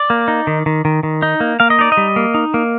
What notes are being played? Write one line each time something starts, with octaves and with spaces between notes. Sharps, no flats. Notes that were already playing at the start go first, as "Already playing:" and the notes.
Already playing: D5
A#3
D#4
D#3
D#3
D#3
D#3
D#4
A#3
A#3 F5
D#5
D#4 D5
D#5
G3
A#3
D#4
A#3